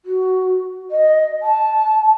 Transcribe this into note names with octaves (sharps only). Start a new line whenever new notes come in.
F#4
D#5
A5